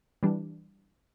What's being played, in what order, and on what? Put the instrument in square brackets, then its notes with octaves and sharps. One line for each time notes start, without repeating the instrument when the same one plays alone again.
[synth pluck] E3 G3 D4